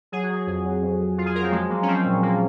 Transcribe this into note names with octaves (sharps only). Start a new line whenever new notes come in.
F#3 G#4
F#4
F#3
G#4
F2 G#4
F#3
F2
F2
F2 F4
G#4
F#3 A#4
C4
F3 G#3
F3 A#3
C#4
F3 C4
A#2
F3 A#3